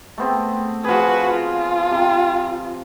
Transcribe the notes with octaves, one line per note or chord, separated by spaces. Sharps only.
A3 B3 C4
F3 F#4 G#4 B4
F4
C3